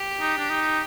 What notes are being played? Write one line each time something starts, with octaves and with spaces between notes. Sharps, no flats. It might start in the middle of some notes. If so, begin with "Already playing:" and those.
Already playing: G4
D#4
D4
D#4